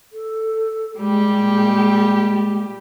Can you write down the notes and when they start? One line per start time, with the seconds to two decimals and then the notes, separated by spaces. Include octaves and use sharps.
0.12 A4
0.97 A#2 G3 G#3 G4